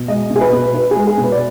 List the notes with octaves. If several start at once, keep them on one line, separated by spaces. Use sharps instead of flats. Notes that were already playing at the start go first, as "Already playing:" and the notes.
Already playing: B2
G#3 D#5
B2
G#4
B4
B2
B3 B4
G#4
G#3
G#4
B2
B4
D5